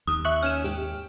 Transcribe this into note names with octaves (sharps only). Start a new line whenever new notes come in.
D#2 D#6
E5 C#6 F#6
C#4 F6 E7
G#2 G4